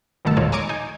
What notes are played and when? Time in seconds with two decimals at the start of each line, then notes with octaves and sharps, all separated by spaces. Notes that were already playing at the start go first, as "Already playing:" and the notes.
0.25 G1 B2 D#3 A3 A5 E6
0.37 D#2 A#2 F3 G#3 C#5
0.52 G#5 A#5 C#6 D6 G#6 C#7
0.69 D#4 G#5